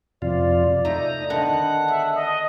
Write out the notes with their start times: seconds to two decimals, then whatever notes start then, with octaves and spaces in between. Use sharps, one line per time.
0.22 F2 C3 F4 D5
0.85 A3 D#4 A#5
1.30 D3 D#3 B3 F#5 A5
1.88 G#4 E5
2.15 D#5 D#6